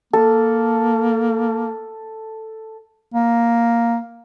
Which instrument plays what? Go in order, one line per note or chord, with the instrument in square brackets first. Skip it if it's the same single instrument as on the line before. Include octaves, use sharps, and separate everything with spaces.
[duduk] A#3 [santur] A4
[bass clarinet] A#3